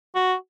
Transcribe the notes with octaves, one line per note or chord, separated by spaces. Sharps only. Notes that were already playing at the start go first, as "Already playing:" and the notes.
F#4